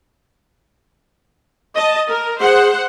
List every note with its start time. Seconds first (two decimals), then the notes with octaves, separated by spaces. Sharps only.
1.76 D#5 A5
2.10 A#4
2.40 G#4 C5 F#5